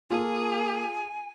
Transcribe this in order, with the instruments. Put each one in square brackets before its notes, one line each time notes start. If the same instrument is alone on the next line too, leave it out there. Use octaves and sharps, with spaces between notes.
[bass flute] A#3 [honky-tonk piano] F4 A4 [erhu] G#4 [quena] G#5